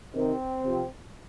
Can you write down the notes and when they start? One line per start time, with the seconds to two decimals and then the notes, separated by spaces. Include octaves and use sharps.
0.14 C3 D#3 C4
0.65 C3 F3